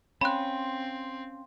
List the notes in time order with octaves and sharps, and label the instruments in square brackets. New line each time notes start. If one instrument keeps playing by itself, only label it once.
[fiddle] C4 [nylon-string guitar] C#4 [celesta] F5 G5 C6 [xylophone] B5 F#6